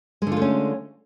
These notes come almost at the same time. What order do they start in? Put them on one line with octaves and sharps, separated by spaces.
G#3 D3 F4 A3 C#4